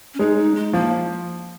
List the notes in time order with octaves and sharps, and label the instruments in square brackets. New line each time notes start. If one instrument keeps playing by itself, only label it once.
[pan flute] C#4
[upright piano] G#3 [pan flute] D#4
[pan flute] D#4
G#3
[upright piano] F3 [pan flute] A#3